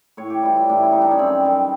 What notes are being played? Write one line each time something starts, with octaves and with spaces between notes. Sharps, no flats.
A2 C#5
G4
E3 G3 F4
E4
A2 D4
E4
E3 G3 D#4
D4
C#4
F#2 C4
D#3 G3